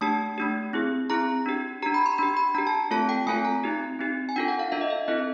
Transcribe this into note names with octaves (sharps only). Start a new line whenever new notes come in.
A3 D4 G4 A5
A3 D4 G4
C4 E4 G#4
C4 E4 G#4 A#5
D4 G4
D4 G4 A#5
B5
C6
D4 G4 B5
B5
D4 G4 A#5
A5
A3 C4 F4 A4 A5
G5
A3 C4 F4 A4 G#5
A#5
C4 D#4 G4
C4 D#4 G4
G#5
D4 F4 A4 G5
F#5
F5
D4 F4 A4 E5
D#5
E5
C4 E4 A4 D#5